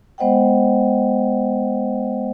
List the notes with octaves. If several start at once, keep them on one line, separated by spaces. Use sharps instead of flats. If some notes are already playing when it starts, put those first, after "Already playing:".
G#3 B3 C5 D#5 F#5 G5